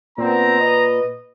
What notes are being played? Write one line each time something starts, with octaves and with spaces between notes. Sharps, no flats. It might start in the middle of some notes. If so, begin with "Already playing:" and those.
A#2 B3 C4 A#5
B4 D#5